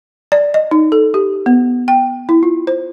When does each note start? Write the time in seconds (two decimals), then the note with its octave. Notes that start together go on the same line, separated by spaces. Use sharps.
0.32 D5
0.54 D#5
0.71 D#4
0.92 A4
1.14 G4
1.46 B3
1.88 G5
2.29 E4
2.43 F4
2.67 C5